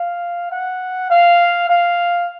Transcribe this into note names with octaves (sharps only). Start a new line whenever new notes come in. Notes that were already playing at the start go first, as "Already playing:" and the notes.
Already playing: F5
F#5
F5
F5